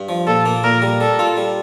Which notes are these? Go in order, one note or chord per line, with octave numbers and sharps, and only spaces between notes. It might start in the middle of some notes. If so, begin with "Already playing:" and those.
Already playing: G2
F3
A#2 A4
A#3
A#2 A#4
G3
G3 A4
F4
G3